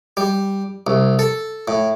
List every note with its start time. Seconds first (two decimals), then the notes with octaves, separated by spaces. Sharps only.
0.17 G3
0.87 C2
1.19 A4
1.68 A2